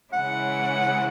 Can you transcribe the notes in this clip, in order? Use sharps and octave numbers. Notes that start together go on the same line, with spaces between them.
C#3 E3 G#3 C#4 E4 F#5